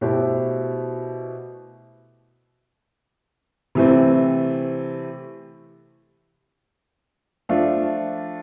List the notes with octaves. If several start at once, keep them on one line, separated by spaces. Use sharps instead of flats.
B2 A3 E4 G4 C5
C3 E3 A3 C4
F3 A3 D4 F4